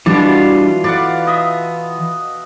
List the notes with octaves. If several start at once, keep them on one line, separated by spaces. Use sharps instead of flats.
B2 E3 G3 D4 F4 D5
B4 D5 F5 F#5
D#5 E5